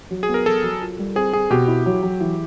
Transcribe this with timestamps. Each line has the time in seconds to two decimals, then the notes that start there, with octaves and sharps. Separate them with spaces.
0.11 F#3
0.23 G#4
0.29 B3
0.34 A#4
0.46 F#3 A4
0.63 F#3
0.82 F4
0.99 G3
1.15 C4 G#4
1.33 C4 G#4
1.50 B2 G4
1.68 E4
1.86 F#3
2.03 F#3
2.21 E3